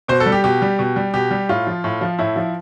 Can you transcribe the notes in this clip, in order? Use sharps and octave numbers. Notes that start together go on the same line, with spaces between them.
B2 C5
A4
G3
G4
B2 G4
G3
B2
G3
B2 G4
G3
A2 F4
F3
A2
F3
A2 E4
F3